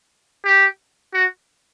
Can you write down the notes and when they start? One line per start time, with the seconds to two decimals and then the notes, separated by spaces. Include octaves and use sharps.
0.45 G4
1.14 F#4